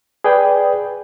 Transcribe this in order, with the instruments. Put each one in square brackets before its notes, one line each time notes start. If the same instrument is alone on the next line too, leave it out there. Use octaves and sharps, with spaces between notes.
[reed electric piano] G#4 B4 D5 G5